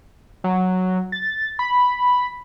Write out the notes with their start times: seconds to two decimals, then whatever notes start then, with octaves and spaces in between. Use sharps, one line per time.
0.44 F#3
1.12 A6
1.59 B5